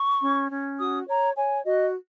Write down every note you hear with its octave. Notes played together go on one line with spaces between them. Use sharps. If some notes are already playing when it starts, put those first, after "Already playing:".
Already playing: C#6
C#4
C#4
F#4 D#6
C#5 A#5
C#5 G#5
F#4 D#5